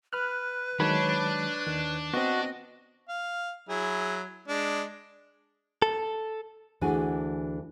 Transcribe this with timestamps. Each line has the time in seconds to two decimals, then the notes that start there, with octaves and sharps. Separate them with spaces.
0.13 B4 B5 F6 F#6
0.80 D#3 F#3 G#3 D4 C#5 B5
1.67 D#2 D#3
2.14 B3 C4 F#4 D#5
3.09 F5
3.69 F#3 E4 G#4
4.48 G#3 D4
5.82 A4
6.81 D2 E3 D4 F#4 G#4 G#5